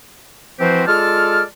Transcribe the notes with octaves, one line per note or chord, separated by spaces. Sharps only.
E3 F3 C4 F#4 G4 C5
G#3 F4 A4 D5 A5 F6